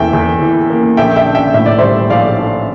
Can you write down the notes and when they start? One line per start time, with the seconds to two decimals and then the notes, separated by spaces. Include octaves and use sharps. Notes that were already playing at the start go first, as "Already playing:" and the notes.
Already playing: E2 E3 A#3 E5 G5
0.13 E2
0.41 E3
0.70 A#3
0.97 A#1 E5 G5
1.16 E5 G5
1.26 D4
1.35 E5 G5
1.54 A2 E5
1.66 D5
1.78 G3 C5 E5
2.10 A#1 D5 F5
2.38 D4